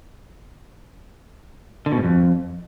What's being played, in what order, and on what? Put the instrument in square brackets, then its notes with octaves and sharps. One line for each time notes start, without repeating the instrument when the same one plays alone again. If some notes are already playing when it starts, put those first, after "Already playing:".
[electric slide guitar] D3
B2
G#2
F2